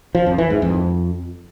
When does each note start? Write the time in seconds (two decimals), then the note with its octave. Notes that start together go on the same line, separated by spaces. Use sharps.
0.15 F3
0.26 F2
0.38 E3
0.50 G#2
0.62 F2